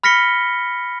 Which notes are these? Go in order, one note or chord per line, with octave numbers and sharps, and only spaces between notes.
B5 F6 A#6 B6 C#7 G7